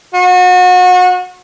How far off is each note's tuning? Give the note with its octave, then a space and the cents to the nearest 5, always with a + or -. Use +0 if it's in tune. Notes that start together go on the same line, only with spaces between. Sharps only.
F#4 -30